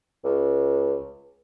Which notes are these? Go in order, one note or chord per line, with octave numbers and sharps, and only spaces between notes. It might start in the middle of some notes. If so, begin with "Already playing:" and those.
C#2